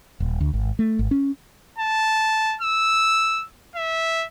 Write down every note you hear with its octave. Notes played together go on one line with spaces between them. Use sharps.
D#1
D2
G#1
A3
G#1
C#4
A5
E6
E5